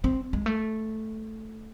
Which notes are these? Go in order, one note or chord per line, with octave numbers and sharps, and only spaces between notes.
C4
G#3
A3